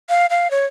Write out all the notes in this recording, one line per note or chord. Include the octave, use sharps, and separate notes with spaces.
F5
F5
C#5